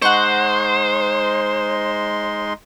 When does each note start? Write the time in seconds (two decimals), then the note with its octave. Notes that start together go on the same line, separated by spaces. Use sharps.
0.02 G#3 D#4 C5 F#5 C6 C#6